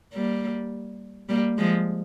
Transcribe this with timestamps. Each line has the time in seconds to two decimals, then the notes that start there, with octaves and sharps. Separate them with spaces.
0.13 G3 A#3
1.29 G3 A#3
1.58 F3 G#3